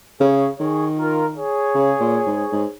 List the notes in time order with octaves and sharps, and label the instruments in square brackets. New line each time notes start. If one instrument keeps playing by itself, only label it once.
[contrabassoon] C#3 [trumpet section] G#4 C#5
[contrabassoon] D#3 [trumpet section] G#4 C#5
[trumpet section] F4 A#4
G#4 C#5
[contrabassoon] C#3
A#2
G#2
G#2